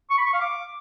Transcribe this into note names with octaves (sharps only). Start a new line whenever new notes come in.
C#6
B5
C#6
F5
D6